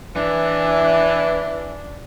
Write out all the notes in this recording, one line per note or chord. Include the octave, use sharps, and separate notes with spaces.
E3 D4